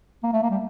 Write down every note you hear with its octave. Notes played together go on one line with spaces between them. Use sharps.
A#3
A3
A#3
G3